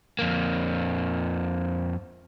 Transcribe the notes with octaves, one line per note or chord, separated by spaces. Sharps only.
F2 A#3